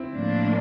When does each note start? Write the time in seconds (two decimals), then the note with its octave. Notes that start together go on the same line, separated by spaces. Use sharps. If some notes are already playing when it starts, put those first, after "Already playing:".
Already playing: C4 E4
0.13 A2 F3 A#3 D4